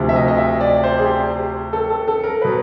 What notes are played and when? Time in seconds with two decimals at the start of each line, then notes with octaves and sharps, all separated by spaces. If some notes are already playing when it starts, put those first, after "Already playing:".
Already playing: D2 C3 F3
0.09 E5
0.16 D#5
0.28 D#5
0.38 E5
0.61 D5
0.84 C5
0.99 G#4
1.05 G4
1.73 A4
1.90 A4
2.08 A4
2.24 A#4
2.42 B2 B4